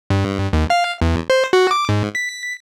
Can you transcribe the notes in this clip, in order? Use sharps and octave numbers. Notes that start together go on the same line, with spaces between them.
G2
D#2
F5
E2
C5
F#4
D6
G#2
B6